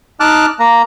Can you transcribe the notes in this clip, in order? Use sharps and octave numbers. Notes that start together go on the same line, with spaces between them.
D#4 A5 D6 F6 F#6
A#3 A#5